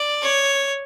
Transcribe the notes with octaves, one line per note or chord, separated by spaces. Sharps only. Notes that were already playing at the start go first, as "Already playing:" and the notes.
Already playing: D5
C#5